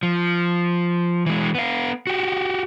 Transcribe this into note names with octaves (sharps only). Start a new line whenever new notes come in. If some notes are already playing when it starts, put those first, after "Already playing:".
F3
E3 G#3
B3 F5
F#4 G4